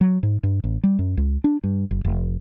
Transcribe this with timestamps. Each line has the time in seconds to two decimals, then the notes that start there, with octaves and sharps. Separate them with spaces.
0.01 F#3
0.23 G#2
0.43 G2
0.64 A1
0.83 G3
0.99 F#2
1.17 C#2
1.44 D4
1.64 G2
1.91 F#1
2.05 F1